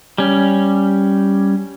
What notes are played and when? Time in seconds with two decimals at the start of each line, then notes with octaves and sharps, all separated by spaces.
0.18 G3 C#4